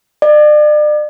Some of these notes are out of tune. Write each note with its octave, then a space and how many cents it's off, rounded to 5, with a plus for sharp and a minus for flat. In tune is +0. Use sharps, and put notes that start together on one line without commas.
D5 +40